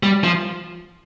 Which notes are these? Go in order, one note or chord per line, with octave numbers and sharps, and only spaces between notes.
G3
F3